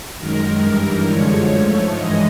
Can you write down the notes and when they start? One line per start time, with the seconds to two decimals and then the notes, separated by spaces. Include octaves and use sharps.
0.16 F#2 D#3 G#3 A#4
0.62 G2 E3 G3 A#4
1.06 F#2 D3 F3 G#3 C#5
1.51 G#2 F3 A3
1.96 G2 E3 G#3 D#5